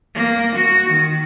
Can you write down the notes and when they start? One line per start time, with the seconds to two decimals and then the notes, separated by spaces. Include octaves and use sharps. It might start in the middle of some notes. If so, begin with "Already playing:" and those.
0.15 A#3
0.56 F#4
0.90 D#3